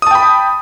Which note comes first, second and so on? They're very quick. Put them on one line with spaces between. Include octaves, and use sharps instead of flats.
D#6 A5 G5 B5